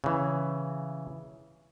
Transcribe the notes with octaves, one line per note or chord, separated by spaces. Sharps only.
C#3 E3